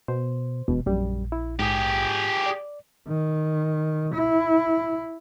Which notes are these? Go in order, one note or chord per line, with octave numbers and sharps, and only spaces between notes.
B2 C5
E1 B2
A#1 F#2 G3
E4
G#2 G4 G#4
D5
D#3
E4